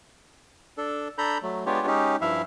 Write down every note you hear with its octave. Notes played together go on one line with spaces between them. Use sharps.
D4 A4
D4 A4 A#5 B5 G6
F#3 A3
G#3 B3 D4 F4 G4 C#5
G#3 C#4 D#4 G4
G2 F3 E4 E5 F5